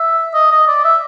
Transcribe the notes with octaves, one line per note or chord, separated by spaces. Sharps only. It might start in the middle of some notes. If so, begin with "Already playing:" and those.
Already playing: E5
D#5
D#5
D5
E5